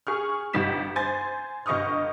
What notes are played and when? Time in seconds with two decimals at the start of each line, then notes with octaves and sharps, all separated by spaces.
0.07 G#4 C#6 F6
0.53 G1 G3 D#4 B6 E7
0.96 C5 G#5 A6
1.66 G1 D#5 C#6 D#6 F6